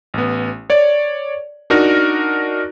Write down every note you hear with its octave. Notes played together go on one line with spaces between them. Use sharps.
A1 B3
C#5 D5
D4 D#4 F#4 A#4